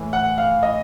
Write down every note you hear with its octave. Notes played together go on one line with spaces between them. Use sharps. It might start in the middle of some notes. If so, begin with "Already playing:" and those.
Already playing: A2 E3
F#5
F5
D#5